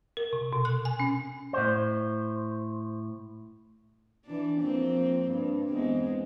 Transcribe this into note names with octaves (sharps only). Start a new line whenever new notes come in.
A#4
C3
B2
F#6
G#5
C#4
A2 C5
E3 D4
F2 A#3 C4
G2
E2 G#3 C4